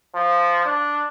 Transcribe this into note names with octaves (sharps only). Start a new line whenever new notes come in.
F3
D4